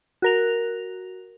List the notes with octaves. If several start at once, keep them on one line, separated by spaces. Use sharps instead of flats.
F#4 A#4 F7